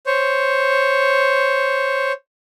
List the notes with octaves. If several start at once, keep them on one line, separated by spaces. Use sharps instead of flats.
C5 C#5